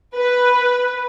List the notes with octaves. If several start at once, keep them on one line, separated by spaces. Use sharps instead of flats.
B4